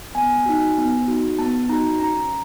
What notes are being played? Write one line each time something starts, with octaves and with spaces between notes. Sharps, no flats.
B3 G#5
D#4 F#4
B3
D#4 F#4
B3 A5
D#4 F#4 A#5
C#4 A#5